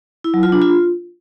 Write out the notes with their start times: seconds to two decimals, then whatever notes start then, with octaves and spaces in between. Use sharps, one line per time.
0.24 E4
0.34 F#3
0.43 F4
0.52 D4
0.62 F4